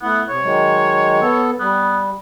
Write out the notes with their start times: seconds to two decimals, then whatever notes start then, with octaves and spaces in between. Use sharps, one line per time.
0.03 A3 B3 E4 F#5
0.29 C3 C#5
0.43 D#3 F#3 G#3
1.21 B3 A4
1.59 G3 B3